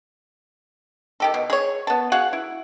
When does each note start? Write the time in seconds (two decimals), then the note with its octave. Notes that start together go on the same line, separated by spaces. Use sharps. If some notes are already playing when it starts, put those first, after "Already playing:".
1.20 D#3 G4 A4
1.34 B2
1.50 G#4 C#5
1.87 B3 A5
2.12 F#4 G#4 F5 F#5
2.33 E4